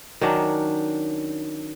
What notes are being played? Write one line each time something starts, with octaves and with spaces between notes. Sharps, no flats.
D#3 F#3 C#4 D4